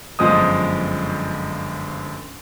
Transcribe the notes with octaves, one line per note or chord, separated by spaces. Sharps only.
G1 F#2 F3 G#3 D#5 D#6